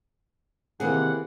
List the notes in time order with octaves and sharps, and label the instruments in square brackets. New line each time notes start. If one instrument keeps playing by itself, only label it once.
[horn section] C3 D#3 [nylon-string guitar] E3 A#3 G#4 [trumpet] F#5